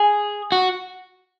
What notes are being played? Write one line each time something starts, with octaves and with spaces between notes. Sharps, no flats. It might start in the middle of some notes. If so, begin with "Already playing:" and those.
Already playing: G#4
F#4